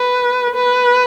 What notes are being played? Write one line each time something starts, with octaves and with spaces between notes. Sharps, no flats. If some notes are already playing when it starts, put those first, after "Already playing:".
Already playing: B4
B4